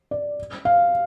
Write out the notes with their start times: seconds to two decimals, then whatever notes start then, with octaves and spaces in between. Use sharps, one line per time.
0.11 D5
0.65 F5